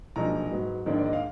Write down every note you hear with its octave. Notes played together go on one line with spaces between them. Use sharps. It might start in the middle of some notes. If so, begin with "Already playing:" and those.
B1 A#2 F3 G#3 D4 A#5
G#2 F#3 B3
A#1 G#2 D#3 A#3 D4
D5
D#5
F5